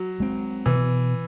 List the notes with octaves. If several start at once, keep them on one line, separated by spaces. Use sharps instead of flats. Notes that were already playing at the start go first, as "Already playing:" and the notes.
Already playing: F#3
G#3 C4
B2 E3